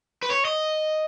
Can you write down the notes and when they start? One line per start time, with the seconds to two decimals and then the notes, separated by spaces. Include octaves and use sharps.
0.23 B4
0.30 C#5
0.45 D#5